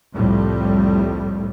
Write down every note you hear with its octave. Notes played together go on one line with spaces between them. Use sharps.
C2 F2 A2 G3